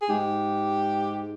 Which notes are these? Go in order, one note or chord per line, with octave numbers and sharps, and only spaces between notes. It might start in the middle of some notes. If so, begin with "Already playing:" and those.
G#4
G#2 G4